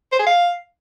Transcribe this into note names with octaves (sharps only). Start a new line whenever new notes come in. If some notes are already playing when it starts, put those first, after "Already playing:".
C5
G#4
F5